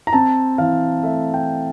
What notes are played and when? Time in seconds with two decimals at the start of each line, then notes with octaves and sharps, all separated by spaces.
0.07 A#5
0.13 C4 A5
0.58 E3 F5
1.03 A3 E5
1.34 G5